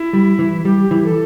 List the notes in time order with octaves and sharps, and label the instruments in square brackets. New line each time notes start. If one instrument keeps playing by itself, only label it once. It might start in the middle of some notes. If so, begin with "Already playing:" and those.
Already playing: [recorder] E4
[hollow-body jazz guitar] G3
E3
[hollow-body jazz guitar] G3 [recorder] G4
[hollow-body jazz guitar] E3
[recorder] A4